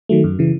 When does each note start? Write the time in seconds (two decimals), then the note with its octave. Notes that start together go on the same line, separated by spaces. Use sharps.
0.09 D#3 F#3 A3
0.24 F#2
0.39 C#3 E3